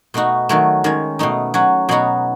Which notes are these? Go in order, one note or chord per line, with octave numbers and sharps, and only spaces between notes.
B2 A3 D#4 F#4
D#3 F#3 A3
D#3 G#3 C#4
B2 A3 D#4
F#3 C#4 F#4
B2 F#3 B3 D#4 F#4